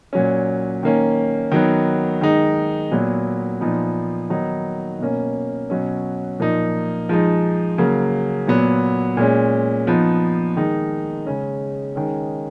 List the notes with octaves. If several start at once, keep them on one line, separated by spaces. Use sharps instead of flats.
A#2 F#3 C#4
D#3 A#3 C#4
D#3 F#3 B3
D#3 G#3 D#4
A#2 F#3 B3
A#2 F3 B3 D#4
D#3 F#3 B3 D#4
B2 A#3 C#4
B2 F#3 C#4
A#2 F3 A#3 D#4
F3 G#3 D#4
C#3 F#3 A#3
A#2 F#3 B3
A#2 G#3 C#4
F3 B3 D#4
D#3 G#3 D#4
C#3 G#3 C#4
D#3 G#3 C#4